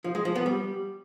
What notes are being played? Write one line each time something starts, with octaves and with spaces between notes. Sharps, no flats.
F3
G#3
F3
B3
G3